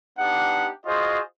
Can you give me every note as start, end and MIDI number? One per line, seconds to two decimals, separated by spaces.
0.19 0.69 59
0.19 0.69 62
0.19 0.69 63
0.19 0.69 67
0.19 0.69 78
0.85 1.19 65
0.85 1.19 66
0.85 1.19 68
0.85 1.19 72
0.85 1.19 75